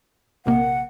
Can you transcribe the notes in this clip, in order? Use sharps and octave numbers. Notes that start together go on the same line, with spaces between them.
A#1 C3 A#3 F#5